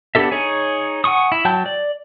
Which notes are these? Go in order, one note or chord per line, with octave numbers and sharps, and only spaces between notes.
B3 D4 G4 A4 E5
D#4 G#4 C#5 G#5
F#5 G#5 C#6 D#6
E4
F#3 G5 A5 G6
D5